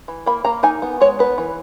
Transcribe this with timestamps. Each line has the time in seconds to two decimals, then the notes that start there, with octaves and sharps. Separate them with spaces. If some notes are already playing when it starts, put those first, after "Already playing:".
0.08 E3
0.26 A#3 B5
0.45 A#3 A#5
0.63 D#4 G#5
0.82 B3
1.01 G#3 C#5
1.19 B3 B4
1.38 E3